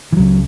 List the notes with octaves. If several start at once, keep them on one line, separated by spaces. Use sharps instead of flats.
E3
C#2 C#3 F#3